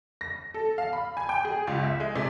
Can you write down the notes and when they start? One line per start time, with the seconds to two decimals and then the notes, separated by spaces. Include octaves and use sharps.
0.21 A#6
0.54 A4
0.78 F5
0.93 B5
1.17 G#5
1.29 G5
1.45 G#4
1.67 C#2
1.83 E5
2.00 G#3
2.16 C3